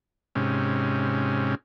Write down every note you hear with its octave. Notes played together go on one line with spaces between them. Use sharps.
G#2 C3 C#4